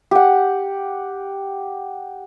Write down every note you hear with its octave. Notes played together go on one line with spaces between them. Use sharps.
G4 F#5